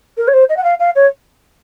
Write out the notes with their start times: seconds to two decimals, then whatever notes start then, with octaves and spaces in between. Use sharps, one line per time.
0.18 A#4
0.28 C#5
0.33 C5
0.49 D#5
0.57 F#5
0.64 F5
0.79 F5
0.95 C#5